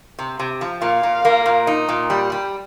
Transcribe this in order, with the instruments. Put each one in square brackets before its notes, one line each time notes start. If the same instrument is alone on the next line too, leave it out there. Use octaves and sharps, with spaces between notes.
[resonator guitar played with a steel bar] C3
C3
F3
[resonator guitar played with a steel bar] A#2 [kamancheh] F5
[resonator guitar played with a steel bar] A#2
A#3
A#2
D#4
A#2
G3
G3